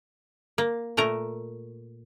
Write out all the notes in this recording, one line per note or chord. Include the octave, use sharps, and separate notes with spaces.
A#3
A#2 A3 A#4 A#5